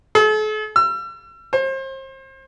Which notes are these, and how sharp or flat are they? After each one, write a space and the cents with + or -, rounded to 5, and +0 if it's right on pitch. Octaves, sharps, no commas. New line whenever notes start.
A4 -45
E6 +40
C5 +35